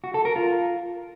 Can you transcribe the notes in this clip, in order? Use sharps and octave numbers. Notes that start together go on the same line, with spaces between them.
F#4
A4
A#4
F4